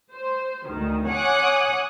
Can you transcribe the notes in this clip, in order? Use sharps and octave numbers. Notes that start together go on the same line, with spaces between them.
C5
D2 D#3
C#5 F#5 G#5 D6 D#6 F#6